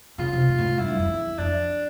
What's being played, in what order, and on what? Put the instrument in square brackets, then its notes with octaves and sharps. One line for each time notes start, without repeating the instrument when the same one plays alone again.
[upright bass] C#3 [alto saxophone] F4
[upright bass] C3
A#2
A2
G#2
[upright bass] G2 [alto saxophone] E4
[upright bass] F#2
F2
E2
[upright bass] F2 [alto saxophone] D4